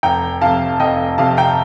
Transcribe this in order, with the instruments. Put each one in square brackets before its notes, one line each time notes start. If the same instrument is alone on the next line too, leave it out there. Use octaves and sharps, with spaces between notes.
[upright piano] F1 G5 A#5
F2 C3 F5 A5
F1 D#5 G5
F2 C3 F5 A5
G5 A#5